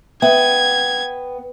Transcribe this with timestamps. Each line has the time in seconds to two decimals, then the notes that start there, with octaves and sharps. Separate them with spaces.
0.22 B3 E5 G5 G#6